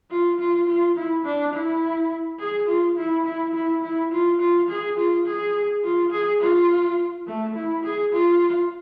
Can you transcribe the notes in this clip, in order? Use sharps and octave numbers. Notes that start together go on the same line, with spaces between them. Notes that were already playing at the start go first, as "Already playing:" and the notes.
F4
F4
F4
E4
D4
E4
G#4
F4
E4
E4
E4
E4
F4
F4
G#4
F4
G#4
F4
G#4
F4
A3
E4
G#4
F4